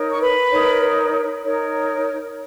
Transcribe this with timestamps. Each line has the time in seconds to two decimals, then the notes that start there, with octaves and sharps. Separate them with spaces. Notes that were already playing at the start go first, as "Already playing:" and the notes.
Already playing: D#4 A#4 C#5
0.11 C#6
0.21 B4 B5
0.52 D#4 A#4 C#5
1.44 D#4 A#4 C#5